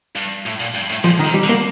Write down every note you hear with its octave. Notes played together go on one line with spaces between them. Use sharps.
G2
A2
A#2
G2
A2
A#2 F3
D#3
C3
G3
D3
A#3